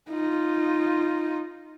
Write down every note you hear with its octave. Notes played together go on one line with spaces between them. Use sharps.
D#4 F4